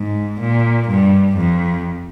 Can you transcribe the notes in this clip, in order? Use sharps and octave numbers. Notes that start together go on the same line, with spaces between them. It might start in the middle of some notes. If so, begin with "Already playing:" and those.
Already playing: G#2
A#2
G2
F2